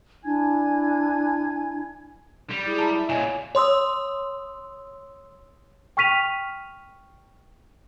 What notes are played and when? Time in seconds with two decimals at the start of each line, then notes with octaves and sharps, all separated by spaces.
0.24 D4 E4 G#5 G#6
2.50 G3
2.65 E4 G#4
2.78 A5 A#5
2.94 E5
3.10 A#2 C#3 C#5 D#5 G#5
3.55 C#5 C6 D#6 E6
5.97 G5 C#6 F6 B6 D#7 F7